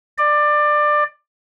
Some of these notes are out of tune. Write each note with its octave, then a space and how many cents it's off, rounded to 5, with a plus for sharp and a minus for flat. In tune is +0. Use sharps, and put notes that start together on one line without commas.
D5 +20